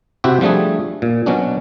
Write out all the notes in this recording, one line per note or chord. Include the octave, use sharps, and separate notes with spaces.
C3 C4 E4 F#4 G4
F3 G3 A3 D4 G#4
A#2
B2 F#3 C#4 D4